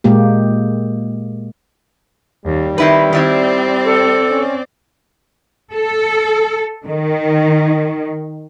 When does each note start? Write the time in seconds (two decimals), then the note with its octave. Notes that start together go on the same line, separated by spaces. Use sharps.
0.04 A#2 G#3 A#3 G4
2.46 D#2 G3
2.78 D#3 C4 E4 B4
3.13 D#3 C4 E4 G4 D5
3.85 A4
4.31 C#4
5.74 A4
6.86 D#3